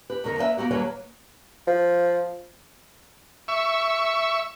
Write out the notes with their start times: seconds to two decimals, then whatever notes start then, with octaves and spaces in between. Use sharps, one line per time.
0.10 G4 B4
0.24 F2 B2 D3 D#3 D#4 A#4
0.38 A#3 B4 C#5 E5
0.57 A#3 B3 F#4 G4
0.71 D#2 F#3 G3 A#3 B4 C#5
1.67 F3
3.48 E5 C#6